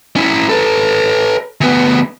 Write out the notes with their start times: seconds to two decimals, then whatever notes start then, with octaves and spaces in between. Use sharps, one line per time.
0.16 C#4 E4
0.49 A4 B4
1.61 D2 B3